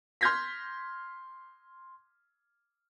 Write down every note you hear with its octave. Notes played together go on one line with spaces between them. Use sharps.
C6 F6 G6 G#6 A#6 B6